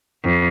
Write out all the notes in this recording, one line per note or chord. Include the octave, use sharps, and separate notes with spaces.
F2